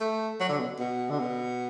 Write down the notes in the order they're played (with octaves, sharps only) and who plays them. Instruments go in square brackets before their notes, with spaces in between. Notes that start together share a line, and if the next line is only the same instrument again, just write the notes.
[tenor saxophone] A3
F#3
D3
B2
B2
D3
B2